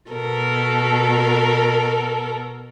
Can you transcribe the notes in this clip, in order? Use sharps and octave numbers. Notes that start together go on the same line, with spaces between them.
B2 A4 A#4